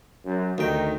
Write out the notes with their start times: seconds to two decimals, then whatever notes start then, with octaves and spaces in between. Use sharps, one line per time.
0.25 F#2
0.58 D2 D#3 G5